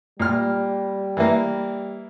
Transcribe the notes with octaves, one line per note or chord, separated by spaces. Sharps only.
A#2 G3 F6
E3 A#3